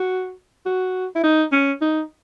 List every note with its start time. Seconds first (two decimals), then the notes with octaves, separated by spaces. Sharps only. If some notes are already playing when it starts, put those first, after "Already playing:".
Already playing: F#4
0.66 F#4
1.15 E4
1.23 D#4
1.52 C#4
1.82 D#4